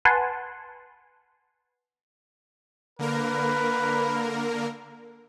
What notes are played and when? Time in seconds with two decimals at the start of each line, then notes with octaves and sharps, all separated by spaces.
0.05 B4 F#5 G#5 A5 C6
2.99 D3 A#3 A#4 B4